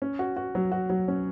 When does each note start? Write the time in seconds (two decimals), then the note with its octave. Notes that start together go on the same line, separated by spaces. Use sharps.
0.02 C#4
0.19 F#4
0.37 F#4
0.55 F#3
0.72 F#4
0.90 F#3
1.08 C#4